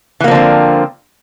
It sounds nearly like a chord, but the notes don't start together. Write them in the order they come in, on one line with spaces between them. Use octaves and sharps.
E3 A#3 F3 D3 C4